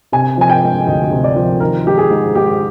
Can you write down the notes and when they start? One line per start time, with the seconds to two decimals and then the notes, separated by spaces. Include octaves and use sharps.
0.12 C3 G#5
0.38 F3 G#5
0.50 G5
0.63 G#3
0.87 D2 D#5
1.11 C3
1.24 D5
1.36 F3
1.60 D#3 A#4
1.86 G#3 G4
1.98 G#4
2.10 G#2
2.35 G#2 G4